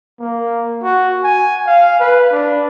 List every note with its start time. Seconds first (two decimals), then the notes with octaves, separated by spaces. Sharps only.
0.20 A#3
0.83 F#4
1.24 G#5
1.67 F5
2.00 B4
2.32 D4